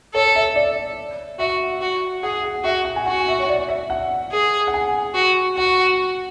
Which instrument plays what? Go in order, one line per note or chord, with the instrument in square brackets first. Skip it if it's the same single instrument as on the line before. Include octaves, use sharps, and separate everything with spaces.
[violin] A4 [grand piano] C#5
[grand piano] E5
D5
[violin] F#4 [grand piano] E5
[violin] F#4
[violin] G#4 [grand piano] F#5
[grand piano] F#5
[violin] F#4 [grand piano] E5
[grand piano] F#5
G#5
[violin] F#4 [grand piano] F#5
[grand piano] E5
C#5
D5
E5
F#5
[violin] G#4
[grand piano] F#5
G#5
[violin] F#4
[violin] F#4 [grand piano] F#5